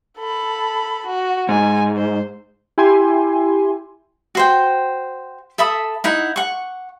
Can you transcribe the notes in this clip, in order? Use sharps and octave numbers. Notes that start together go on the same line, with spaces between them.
A4 B5
F#4
G#2 G#5
C5
E4 G4 G#5 C6
F#4 C5 G5
A4 E5 B5 D#6
D#4 E4 F#5
F#5 C#6